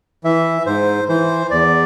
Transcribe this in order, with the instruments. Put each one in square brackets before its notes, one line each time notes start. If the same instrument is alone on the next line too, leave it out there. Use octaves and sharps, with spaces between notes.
[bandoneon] E3 E5
G#2 C5
E3 C5
E2 D5